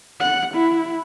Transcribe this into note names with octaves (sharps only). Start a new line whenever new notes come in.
F#5
E4